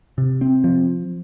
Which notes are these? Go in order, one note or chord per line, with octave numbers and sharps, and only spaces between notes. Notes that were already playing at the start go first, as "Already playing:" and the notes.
C3
C4
F3